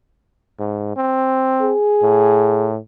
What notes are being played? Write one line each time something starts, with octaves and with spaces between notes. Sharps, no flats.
G#2
C4
G#4
A2